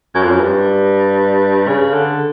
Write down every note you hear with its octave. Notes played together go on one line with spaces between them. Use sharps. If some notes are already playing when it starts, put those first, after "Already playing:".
F#2
F2
F#2
G2
C#3
D3